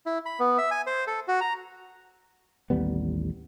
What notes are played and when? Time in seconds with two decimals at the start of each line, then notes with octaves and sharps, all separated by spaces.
0.06 E4
0.26 B5
0.40 B3
0.58 E5
0.71 G#5
0.87 C5
1.07 A4
1.28 F#4
1.41 A#5
2.70 A1 D#2 G3 B3